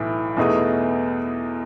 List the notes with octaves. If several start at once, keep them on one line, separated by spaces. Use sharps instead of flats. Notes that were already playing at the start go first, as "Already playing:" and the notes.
Already playing: B1 A2 E3
E2 B2 A3 D#4 G#4